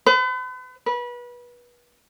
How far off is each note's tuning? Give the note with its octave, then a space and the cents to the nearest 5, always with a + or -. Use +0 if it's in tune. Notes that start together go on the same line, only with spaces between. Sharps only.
B4 +40
B4 -30